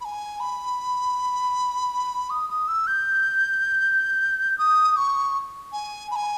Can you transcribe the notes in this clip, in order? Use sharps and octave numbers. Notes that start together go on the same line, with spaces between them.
B5
G#5
B5
D#6
D#6
E6
G6
D#6
C#6
G#5
B5
G#5